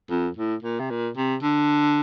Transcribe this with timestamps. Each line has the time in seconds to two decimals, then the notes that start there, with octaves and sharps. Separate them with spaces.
0.10 F2
0.37 A2
0.63 A#2
0.80 C3
0.91 A#2
1.17 C3
1.43 D3